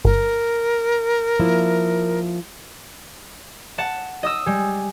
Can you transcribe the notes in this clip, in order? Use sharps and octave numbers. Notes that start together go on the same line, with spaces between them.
G1 A#4
F3 A#3 E4
F#5 A5
D#5 D#6 E6
G3 G#3